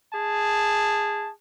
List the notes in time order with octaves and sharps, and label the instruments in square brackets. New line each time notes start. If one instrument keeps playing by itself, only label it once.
[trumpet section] G#4 A5